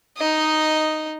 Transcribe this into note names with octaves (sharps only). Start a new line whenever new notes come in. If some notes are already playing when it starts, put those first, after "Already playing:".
D#4 D#5